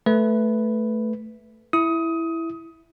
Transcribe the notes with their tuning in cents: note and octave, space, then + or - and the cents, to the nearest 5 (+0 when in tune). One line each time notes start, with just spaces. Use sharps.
A3 +0 B4 +0
E4 +0 D#6 +20